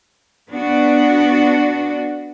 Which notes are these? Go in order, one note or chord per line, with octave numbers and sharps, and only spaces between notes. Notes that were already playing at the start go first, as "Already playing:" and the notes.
B3 D4 F#4